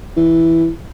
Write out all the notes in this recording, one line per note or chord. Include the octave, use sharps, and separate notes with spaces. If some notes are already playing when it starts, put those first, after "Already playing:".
E3